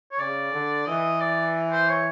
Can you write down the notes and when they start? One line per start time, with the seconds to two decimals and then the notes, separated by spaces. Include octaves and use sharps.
0.12 C#5
0.18 C#3 D5
0.53 D3
0.86 E3 D#5
1.21 D5
1.72 C5
1.89 C#5